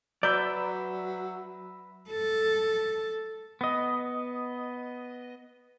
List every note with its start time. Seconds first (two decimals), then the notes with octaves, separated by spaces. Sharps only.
0.23 F#3 B4 D5 E5 A#5 G6
2.11 A4
3.61 B3 D#5